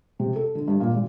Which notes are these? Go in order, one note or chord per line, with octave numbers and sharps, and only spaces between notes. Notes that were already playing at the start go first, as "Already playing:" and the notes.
C3
A4
D3
G2
A#2
G#1